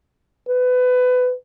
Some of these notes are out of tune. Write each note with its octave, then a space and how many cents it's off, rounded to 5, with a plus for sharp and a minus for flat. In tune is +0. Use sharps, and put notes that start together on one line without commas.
B4 +25